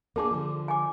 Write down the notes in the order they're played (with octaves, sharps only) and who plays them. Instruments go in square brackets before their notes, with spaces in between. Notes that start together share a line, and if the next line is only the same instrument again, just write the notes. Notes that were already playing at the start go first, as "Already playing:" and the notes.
[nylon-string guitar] A#3 D4 G#4 [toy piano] A4 A5 D6
[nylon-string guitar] D3 F3
[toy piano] G#5 D6